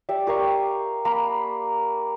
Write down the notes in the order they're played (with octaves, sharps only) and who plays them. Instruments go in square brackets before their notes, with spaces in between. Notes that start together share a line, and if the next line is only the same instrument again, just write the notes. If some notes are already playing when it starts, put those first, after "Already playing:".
[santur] G4 D5 E5
G4 A#4 F5 C#6
A#3 A#4 A#5 B5